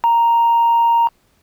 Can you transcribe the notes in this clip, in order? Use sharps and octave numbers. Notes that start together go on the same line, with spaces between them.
A#5